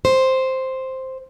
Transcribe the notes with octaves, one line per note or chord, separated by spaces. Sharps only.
C5